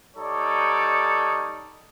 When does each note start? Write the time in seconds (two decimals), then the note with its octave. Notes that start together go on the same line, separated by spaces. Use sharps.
0.17 G3 D#4 A4 C#5 D5